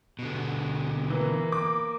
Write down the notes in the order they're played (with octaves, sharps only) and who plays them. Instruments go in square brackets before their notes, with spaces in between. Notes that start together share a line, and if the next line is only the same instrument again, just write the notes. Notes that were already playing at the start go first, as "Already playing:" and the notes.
[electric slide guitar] B2 D3
[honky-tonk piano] E3 [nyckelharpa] A#3
[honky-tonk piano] D6